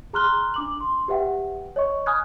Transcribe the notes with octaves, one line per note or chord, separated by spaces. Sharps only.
G#4 A#5 C6 F6 F#6 G7
D4 D6 F#7
C6
G4 B4 E5 F#5 G5
C#5 D#5 C#6
G#5 B5 D#6 F6 F#6 G#6